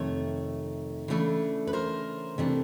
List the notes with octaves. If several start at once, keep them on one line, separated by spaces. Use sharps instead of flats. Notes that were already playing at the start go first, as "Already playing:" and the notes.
Already playing: F2 C3 D#3 A3 C#5
C#3 E3 A3 D4
B4
A#4 C5
C3 E3 A3 D4